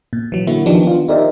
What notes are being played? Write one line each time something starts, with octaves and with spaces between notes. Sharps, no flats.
A#2
E3 F#3
D3 A#3 E4 F#4
D#3 F3 B3 D4 D#4 G4
B3 F4
D#4 G4 A#4 C5 D5 E5